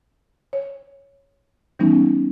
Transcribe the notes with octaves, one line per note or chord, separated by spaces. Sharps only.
C#5
E3 G3 B3 C#4 D#4